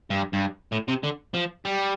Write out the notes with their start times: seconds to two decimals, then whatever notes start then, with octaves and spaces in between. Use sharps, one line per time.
0.10 G2
0.33 G2
0.72 A2
0.88 C3
1.03 D3
1.34 F3
1.65 G3